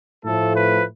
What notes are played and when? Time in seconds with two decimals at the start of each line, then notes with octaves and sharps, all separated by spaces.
0.23 A2 F3 A3 A4
0.54 B4